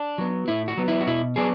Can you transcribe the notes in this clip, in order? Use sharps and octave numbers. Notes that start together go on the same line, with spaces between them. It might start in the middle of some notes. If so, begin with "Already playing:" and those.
Already playing: D4
F#3 B3
A2 E4
F#4
F#3 B3
E4
F#4
B2 E4
F#3 B3 D4 G#4